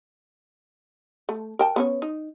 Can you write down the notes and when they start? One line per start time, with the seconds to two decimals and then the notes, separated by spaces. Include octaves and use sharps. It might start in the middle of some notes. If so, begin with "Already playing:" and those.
1.29 A3
1.59 A#4 G5 A5
1.76 B3 C#4 C#5
2.02 D#4